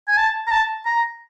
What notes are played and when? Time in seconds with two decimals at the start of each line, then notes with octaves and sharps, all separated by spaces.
0.08 G#5
0.17 A5
0.47 A#5
0.51 A5
0.85 A#5